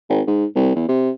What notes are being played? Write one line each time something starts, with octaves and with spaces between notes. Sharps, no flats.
G#1
G#2
C2
E2
C3